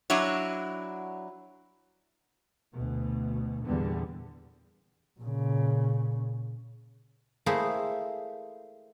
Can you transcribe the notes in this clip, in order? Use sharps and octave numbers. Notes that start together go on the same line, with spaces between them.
F#3 D4 E4 F#4 C#5
D2 B2
E2 A#2 D3 G3 B3
A#2 C#3
A3 A#3 E4 G#4 C5